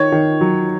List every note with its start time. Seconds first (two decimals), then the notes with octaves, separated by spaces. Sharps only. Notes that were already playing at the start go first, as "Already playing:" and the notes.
Already playing: D#3 C#5
0.12 D#3
0.41 F#3